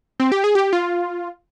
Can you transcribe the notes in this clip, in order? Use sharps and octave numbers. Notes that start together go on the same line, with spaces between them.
C4
G4
G#4
G4
F4